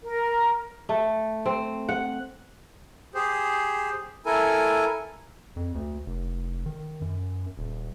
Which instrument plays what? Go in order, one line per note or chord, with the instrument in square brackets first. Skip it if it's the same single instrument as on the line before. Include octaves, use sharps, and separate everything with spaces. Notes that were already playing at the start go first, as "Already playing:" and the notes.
[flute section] A#4
[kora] A3
C4
F#5
[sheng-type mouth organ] G4 G#4 C5
E4 A4 A#4 G#5
[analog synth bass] F2
D2
F1
D#3
F#2
D#1